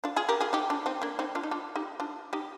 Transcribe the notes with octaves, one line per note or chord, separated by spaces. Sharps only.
D4 F4
F4 G#4
G4 A#4
F4 G#4
D#4 G4
D4 F4
C4 D#4
A#3 D4
C4 D#4
D4 F4
D#4
D4 F4
D#4 G4
D4 F4
D#4 G4